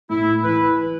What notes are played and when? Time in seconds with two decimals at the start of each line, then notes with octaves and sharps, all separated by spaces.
0.09 A2 E4
0.43 E3 B4